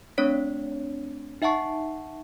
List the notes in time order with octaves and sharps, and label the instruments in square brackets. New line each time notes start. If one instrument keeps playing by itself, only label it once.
[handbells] A3 C4 D4 C#5 B6
D#4 E5 F#5 A5 C#6 C7